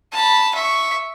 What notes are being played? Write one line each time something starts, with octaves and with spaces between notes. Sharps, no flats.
A5 B5
E5 C#6